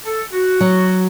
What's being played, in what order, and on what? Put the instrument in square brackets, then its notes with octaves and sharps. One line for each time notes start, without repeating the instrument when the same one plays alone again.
[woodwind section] A4
F#4
[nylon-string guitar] F#3